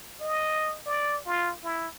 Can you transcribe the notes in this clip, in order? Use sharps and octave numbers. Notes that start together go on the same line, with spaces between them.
D#5
D5
F4
E4